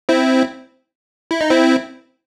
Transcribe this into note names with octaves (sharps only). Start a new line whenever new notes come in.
C4 E4
E4
D#4
C4 E4